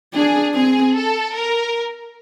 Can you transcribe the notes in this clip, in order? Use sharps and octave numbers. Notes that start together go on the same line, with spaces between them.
D4 G#4
C4 G#4
A4
A#4